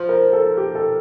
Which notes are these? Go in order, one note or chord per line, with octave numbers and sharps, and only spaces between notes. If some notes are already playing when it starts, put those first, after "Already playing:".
Already playing: F3 C5
A#4
A4
G4
A4